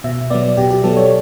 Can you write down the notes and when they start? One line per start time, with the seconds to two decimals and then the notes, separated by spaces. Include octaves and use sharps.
0.04 B2 E5
0.30 F#3 B3 D5
0.57 B2 G4
0.70 G4
0.84 F#3 B3 A4
0.97 C#5